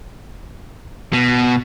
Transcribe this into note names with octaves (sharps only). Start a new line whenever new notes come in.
B2